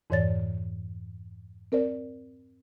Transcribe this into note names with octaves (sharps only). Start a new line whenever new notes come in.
F2 G#2 E3 C#5 D5 A6
C4 A#4 C5 D5